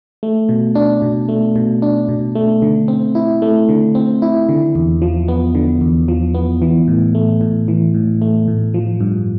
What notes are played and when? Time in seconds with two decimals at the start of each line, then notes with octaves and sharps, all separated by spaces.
0.23 A3
0.49 B2
0.75 D4
1.02 B2
1.29 A3
1.56 B2
1.82 D4
2.09 B2
2.35 A3
2.62 D3
2.88 C4
3.15 E4
3.42 A3
3.69 D3
3.95 C4
4.22 E4
4.49 D3
4.75 E2
5.02 F3
5.28 B3
5.55 D3
5.81 E2
6.08 F3
6.34 B3
6.62 E3
6.88 A2
7.15 A3
7.41 A2
7.68 E3
7.94 A2
8.22 A3
8.48 A2
8.74 F3
9.00 G2